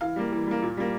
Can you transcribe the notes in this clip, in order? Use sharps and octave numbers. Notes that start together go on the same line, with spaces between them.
E3 F5
G3 A#3
E3
G3 A#3
A#2
G3 A#3